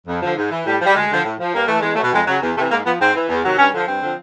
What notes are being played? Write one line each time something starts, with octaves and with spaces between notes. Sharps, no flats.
F2
D3 F3
G#2
E3
A2 G3
F3
G3
D2 G#3
D3 F3
A2
F3
G2 A#3
E3 A3
E2 G#3
F#3 A3
B2
F2 G#3
C#3 F#3
E2
C3 E3 A3
G#2 A#3
F3 B3
G#2 C4
E3
E2
C3 D#3 F#3
G2 C#4
D3 F3
G2 C4
D3 F3